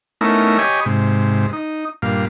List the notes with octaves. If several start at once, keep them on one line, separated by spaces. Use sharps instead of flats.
A3 B3 C#4 D#4 E4 A#4
G4 C#5 D#5 G#5 B5 D#6
G#2 C3
D#4
G2 A#2 F5